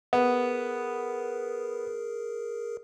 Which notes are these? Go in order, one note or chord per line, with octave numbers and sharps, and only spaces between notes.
B3 G#4 A#4